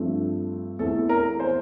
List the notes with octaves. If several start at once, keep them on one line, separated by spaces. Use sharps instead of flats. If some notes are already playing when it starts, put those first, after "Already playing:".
Already playing: G2 F3 A3 C4
E2 E3 A3 C4 A4
A#4
C5